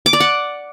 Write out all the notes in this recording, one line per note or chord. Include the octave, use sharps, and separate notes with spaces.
D6
D5
F#5